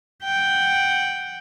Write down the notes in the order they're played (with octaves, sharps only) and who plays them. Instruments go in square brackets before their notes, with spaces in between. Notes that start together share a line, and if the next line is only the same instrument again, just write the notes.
[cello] F#5 G5